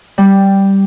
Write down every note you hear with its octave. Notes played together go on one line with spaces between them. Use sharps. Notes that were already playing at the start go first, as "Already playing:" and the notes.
G3